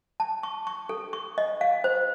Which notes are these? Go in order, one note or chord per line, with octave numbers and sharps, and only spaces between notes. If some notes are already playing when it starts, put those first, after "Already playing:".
A5
C#6
C#6
A4
C#6
D#5
F5
C5